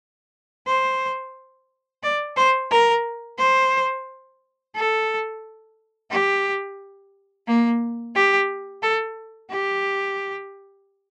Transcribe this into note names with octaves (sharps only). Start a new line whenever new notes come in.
C5
D5
C5
A#4
C5
A4
G4
A#3
G4
A4
G4